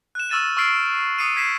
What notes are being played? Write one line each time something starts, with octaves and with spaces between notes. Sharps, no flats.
F#6 E7
C#6 E6 F6 A6 D#7 E7
C#6 E6 F6 A6 C7 D7
D#6 C7 C#7 D#7 E7
G#6 B6 C7 E7